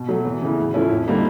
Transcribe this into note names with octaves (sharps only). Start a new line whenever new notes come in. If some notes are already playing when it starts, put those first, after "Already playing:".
Already playing: B2
F#3 A3
E2
C#3 E3
A2
F3 A3 C#4 E4
F2
D3 G3 A#3 D#4